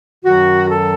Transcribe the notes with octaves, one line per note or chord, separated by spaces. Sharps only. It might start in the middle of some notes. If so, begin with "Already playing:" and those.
F#2 D#3 F#3 F#4
A4